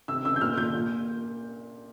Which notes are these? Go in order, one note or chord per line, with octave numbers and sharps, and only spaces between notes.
C3 E6
C#2 E6
G6
A#2 F6
A#2 G6
A#2